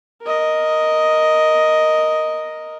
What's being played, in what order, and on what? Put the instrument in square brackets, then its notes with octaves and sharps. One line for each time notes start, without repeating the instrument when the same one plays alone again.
[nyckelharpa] A#4 D#5